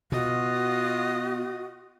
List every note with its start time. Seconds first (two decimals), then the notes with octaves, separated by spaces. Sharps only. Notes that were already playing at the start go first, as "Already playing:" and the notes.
0.12 B2 F4 F#4 D#5